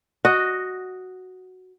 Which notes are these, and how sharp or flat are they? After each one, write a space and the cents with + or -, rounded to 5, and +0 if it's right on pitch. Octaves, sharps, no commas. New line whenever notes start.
F#4 +0 D#5 +0